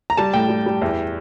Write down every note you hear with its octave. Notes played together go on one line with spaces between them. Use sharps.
A#5
G3 A5
A2 G5
G3
G3
E2